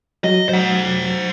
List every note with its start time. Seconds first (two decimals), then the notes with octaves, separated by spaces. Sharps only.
0.24 F#3 D#5
0.49 C5 F#5